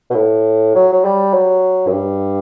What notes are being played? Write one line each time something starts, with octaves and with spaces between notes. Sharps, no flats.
B2
A2
F#3
F#3
G3
F#3
F#2
G2